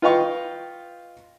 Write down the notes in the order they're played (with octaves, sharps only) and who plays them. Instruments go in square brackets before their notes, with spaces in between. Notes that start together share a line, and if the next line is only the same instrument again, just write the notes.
[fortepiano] F4 B4 D#5 F5 G5 C#6